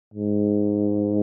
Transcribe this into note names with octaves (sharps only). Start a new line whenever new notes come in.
G#2